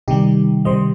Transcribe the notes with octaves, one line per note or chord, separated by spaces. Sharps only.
C3 D#3 G3 D#4 G4
C3 D#3 G3 C5 D#5